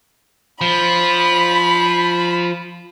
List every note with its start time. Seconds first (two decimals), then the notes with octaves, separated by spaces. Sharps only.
0.61 F3 B5